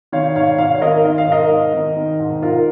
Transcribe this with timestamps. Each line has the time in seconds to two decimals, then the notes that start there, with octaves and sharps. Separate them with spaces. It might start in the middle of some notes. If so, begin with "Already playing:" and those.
0.12 D#3 C#5 F5
0.35 G#2 C#5 F5
0.58 G#2 C#5 F5
0.75 C#5
0.81 D#3 A#4 D#5
1.05 D#3 D#5
1.18 F5
1.28 G#2 A#4 D#5
1.51 G#2
1.74 D#3
1.96 D#3
2.20 G#2
2.42 G#2 F4 A#4